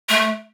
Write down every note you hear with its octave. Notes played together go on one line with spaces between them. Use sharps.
A3